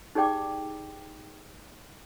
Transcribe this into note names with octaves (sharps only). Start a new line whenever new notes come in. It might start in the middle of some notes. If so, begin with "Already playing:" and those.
D#4 G4 G#4 D5 G5 D6